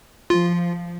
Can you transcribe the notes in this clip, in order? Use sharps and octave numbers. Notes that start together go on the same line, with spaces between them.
F3 F4